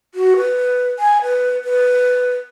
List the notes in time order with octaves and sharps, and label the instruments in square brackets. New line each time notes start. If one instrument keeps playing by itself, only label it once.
[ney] F#4
B4
G#5
B4
B4